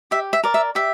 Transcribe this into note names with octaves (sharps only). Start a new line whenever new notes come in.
G4 E5
E5
A#4 D5
E5
G4 E5